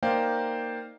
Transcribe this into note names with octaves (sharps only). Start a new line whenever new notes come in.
A#3 D#4 C5 D5 F5 G5